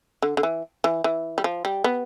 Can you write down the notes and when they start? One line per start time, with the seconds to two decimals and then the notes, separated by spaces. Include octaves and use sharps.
0.22 D3
0.37 D3
0.43 E3
0.84 E3
1.04 E3
1.38 G3
1.44 F3
1.65 G3
1.84 B3